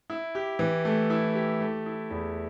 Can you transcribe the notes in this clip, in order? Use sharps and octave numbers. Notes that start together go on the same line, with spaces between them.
E4
G4
E3
A3
E4
G4
A3
E4
E2